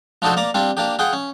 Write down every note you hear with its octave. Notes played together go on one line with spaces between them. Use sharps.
F3 D4 D#4 F#4 A4 C5
A#3 D5 A#5
G3 C4 D4 F4
A#3 D4 G4
F4 G#4 F#5 G5
C#4